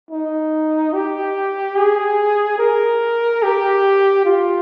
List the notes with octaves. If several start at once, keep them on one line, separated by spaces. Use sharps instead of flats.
D#4
G4
G#4
A#4
G4
F4